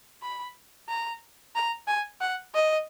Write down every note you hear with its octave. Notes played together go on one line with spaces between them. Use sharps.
B5
A#5
A#5
G#5
F#5
D#5